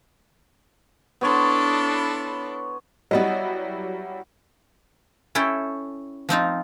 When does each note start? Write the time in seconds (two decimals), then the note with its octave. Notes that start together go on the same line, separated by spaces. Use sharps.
1.21 B3 D4 E4 A4 C#5 C6
3.11 F#3 G3 B3 E4 D5 D#5
5.35 C#4 E4 A4 G5
6.29 F3 C4 D#4 F4